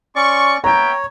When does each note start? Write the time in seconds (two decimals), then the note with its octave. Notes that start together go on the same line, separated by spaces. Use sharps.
0.16 C#4 D5 C6 C#6
0.64 B3 C#5 E5 G5 A#5